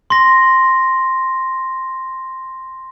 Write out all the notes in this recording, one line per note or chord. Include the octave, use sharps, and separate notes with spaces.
C6 A#6